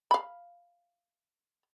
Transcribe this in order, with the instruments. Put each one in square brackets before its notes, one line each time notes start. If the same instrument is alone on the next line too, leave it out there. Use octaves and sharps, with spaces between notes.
[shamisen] F5 B5